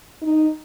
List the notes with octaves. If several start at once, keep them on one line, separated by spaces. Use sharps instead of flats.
D#4